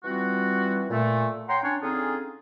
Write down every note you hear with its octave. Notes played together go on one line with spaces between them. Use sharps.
E3 G3 C4 F4 F#4
A#2 A3
C#5 F#5 G5 A#5 C6
C#4 D4 C#5
D3 C4 C#4 D#4 F4 G#4